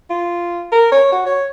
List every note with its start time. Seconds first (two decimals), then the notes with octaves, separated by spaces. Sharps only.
0.10 F4
0.72 A#4
0.92 C#5
1.12 F#4
1.26 C#5